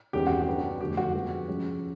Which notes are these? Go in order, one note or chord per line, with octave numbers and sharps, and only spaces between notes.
E2 C3 D#3 G#3 C#4 G4
F#4
G4
F#3 B3 D4
F2 D3 F#3 A3 G4
F#4
C3 F3 G#3 B3
F3 G#3 C#4